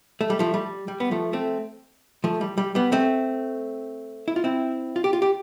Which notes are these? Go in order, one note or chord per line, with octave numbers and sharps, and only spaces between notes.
A3
G3
F3 A3
G3
G3
B3
F3 A3
A3 C4
F3 A3
G3
G3
G3 B3
A3 C4
E4
F4
C4 E4
F4
G4
F4
G4